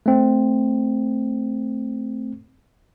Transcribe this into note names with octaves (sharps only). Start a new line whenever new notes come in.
A3 C4